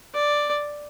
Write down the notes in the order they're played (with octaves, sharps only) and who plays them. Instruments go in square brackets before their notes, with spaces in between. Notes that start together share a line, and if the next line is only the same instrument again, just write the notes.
[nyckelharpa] D5